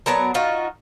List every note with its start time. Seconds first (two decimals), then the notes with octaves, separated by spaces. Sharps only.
0.06 F#3 B3 A#4 A5
0.34 D#4 F4 F#4